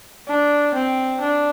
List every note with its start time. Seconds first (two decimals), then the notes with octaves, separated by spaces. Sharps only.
0.28 D4
0.74 C4
1.21 D4